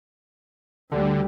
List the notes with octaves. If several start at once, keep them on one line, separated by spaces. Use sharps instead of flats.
D2 D3 G3